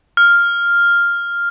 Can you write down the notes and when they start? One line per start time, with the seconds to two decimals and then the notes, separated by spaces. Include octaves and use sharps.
0.17 F6